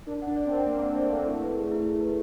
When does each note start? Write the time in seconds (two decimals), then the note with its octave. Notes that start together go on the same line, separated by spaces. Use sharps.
0.07 D4 A#4
0.22 D4 F#5
0.36 D5
0.46 C4
0.51 A#4
0.67 A#3 A#4
0.82 F#5
0.96 A3 D5
1.11 A#3 A#4
1.24 A3 E4
1.41 B4
1.56 G#4
1.71 E4
1.86 E4
2.00 B4